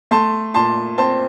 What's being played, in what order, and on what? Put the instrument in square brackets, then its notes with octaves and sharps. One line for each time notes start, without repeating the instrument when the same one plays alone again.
[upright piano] A3 A5 C6
A#2 A5 C6
C4 A5 C6